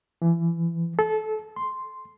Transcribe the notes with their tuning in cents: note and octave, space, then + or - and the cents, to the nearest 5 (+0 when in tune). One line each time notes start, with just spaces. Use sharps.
E3 +25
A4 -25
C6 -5